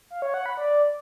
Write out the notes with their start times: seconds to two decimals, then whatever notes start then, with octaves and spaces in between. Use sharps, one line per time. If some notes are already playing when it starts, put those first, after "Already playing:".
0.10 F5
0.22 C#5
0.34 F#5
0.46 B5
0.57 D5